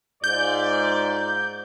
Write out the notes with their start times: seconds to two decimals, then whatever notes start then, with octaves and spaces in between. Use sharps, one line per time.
0.24 G#2 F4 D5 G6